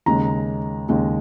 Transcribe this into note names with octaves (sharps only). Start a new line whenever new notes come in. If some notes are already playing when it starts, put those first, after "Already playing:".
D#2 C#3 G#3 A#5
D#2 C#3 G#3